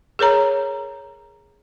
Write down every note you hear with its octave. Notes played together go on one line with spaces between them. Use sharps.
G#4 A#4 C#5 A#5